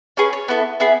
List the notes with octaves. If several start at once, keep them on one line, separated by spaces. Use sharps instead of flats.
C#4 G#4 B4
C#5
B3 E4 A4
B3 E4 G#4